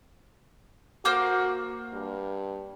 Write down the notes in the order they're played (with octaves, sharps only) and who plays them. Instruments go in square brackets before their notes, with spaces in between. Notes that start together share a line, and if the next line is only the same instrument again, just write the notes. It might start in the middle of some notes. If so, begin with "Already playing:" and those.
[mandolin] A#3 C5 D6 [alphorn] F#4
[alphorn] G2